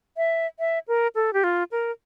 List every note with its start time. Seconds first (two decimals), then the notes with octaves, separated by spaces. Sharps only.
0.17 E5
0.59 E5
0.88 A#4
1.15 A4
1.33 G4
1.44 F4
1.72 A#4